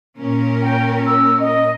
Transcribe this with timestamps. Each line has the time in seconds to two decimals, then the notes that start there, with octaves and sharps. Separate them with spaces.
0.18 A#2 C#4 A#4
0.62 G5
1.06 E6
1.40 D#5